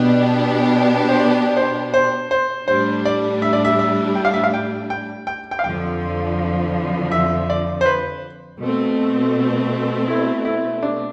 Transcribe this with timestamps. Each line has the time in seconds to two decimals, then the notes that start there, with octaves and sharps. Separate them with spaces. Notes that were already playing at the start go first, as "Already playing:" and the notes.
Already playing: B2 B3 D4 G4
1.09 C5
1.20 D5
1.57 C5
1.94 C5
2.31 C5
2.68 A2 G3 D4 C5
3.05 D5
3.42 E5
3.53 D5
3.65 E5
3.79 E5
4.15 G5
4.25 F5
4.34 E5
4.44 F5
4.54 G5
4.90 G5
5.27 G5
5.51 G5
5.59 F5
5.64 F2 D3 F3 G5
7.12 E5
7.50 D5
7.81 C5
7.86 B4
8.60 B2 A3 C4
10.08 E4
10.45 E4
10.83 D4